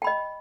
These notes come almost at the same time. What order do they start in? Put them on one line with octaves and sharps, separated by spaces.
G5 B5 D#5